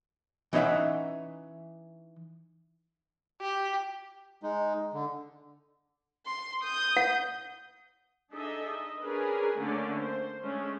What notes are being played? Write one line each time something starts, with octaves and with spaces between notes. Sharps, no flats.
E3 C#4 D#4 D5 E5 F#5
G4
G#3 D#4
D3
C6
D#6 G6
F#5
D4 D#4 G#4 A4 D#5 E5
D#5
C#4 D4 G#4 A#4 B4
D3 A3 A#3 C#4 D4 D5
C5
G#3 A3 C#4 D4